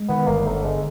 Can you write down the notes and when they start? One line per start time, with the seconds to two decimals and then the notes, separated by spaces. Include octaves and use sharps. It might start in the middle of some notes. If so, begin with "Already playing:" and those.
Already playing: G#3
0.08 D#3 B3
0.27 G1 A#3
0.46 G1 A3
0.64 D3 G#3